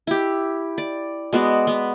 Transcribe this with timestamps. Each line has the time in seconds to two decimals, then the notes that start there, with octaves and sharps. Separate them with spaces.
0.07 E4 G4
0.78 D5
1.33 G#3 B3 F#4 D5
1.67 B3